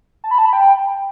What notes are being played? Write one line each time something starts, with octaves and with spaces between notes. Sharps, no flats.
A5
B5
A5
B5
G5